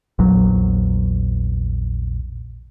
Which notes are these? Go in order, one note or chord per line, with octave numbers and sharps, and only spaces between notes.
A#1 E2 F#3